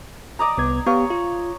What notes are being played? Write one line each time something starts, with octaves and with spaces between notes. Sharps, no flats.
D5 D#5 A#5
C2 B3 G#6
B3 G4 C#5 F5
F4